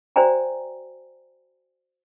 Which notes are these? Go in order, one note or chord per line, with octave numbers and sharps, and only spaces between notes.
F#4 C5 D5 G5 G#5 A#5